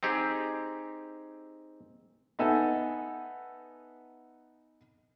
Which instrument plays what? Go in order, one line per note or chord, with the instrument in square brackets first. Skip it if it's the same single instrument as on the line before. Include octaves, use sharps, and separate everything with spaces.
[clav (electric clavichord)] C4 D#4 G4 G#4
[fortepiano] B3 D#4 A4 E5 G#5